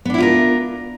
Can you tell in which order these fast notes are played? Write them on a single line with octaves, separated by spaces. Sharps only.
B3 D4 E4 F4 A#4